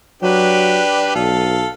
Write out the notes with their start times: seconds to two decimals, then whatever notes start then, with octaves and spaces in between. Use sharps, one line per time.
0.22 F#3 D4 G4 B4
1.15 B1 A4 F5